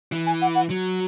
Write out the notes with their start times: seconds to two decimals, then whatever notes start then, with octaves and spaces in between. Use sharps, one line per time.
0.12 E3
0.26 G#5
0.42 F#5
0.55 F#5
0.70 F#3